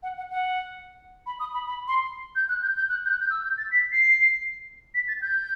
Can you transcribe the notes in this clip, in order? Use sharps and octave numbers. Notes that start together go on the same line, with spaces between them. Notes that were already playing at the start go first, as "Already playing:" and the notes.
F#5
F#5
F#5
B5
D#6
B5
B5
C6
G6
F#6
G6
G6
F#6
G6
F#6
G6
E6
G6
A6
B6
C7
B6
A6
G6